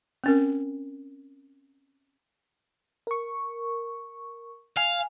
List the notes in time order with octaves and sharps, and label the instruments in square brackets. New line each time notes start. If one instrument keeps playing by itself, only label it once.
[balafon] C4 C#4 A#4
[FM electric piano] A#4 C#6
[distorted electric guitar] F5 [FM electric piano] G#5